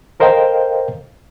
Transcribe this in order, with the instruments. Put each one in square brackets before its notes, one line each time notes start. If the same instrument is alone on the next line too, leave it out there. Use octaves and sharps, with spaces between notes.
[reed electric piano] A4 A#4 C5 D#5 F5 G5